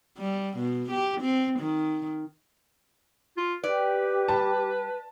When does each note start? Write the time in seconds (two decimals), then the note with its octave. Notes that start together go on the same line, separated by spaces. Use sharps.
0.18 G3
0.57 B2
0.91 G4
1.21 C4
1.59 D#3
3.37 F4
3.64 G4 B4 D5
4.28 G3 A5